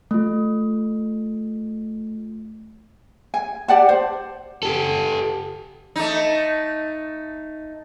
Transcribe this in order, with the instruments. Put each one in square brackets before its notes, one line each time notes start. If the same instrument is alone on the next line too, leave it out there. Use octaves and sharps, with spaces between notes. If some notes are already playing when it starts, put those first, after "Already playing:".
[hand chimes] A3 F4
[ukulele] G#5
G4 D5 F#5 A5
C5
[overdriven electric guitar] G4 A4
[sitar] A3 D#4